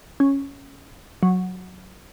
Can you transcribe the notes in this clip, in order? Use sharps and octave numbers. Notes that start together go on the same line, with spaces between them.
C#4
F#3